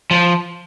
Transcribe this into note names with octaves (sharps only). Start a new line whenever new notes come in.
F3